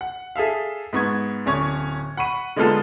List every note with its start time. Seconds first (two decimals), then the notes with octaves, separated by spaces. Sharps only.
0.01 F#5
0.36 G#4 A4 E5 F5
0.93 G#2 B3 C#6 G#6
1.46 D1 C#4 C#5 C#6
2.17 F#5 B5 C#6 D#7
2.56 D3 G#3 A#3 B3 F4 A4